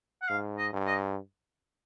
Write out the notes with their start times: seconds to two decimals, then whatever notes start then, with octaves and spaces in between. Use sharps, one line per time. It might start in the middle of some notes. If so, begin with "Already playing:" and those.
0.22 F#5
0.29 G#2 F5
0.58 D#5
0.73 G2
0.87 D#5